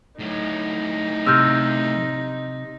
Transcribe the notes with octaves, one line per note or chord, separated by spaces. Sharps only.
A2 F#3 D#4
C3 E6 F6 G6